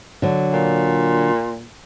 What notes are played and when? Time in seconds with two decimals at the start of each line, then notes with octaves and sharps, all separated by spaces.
0.22 D3 F#3
0.53 A#2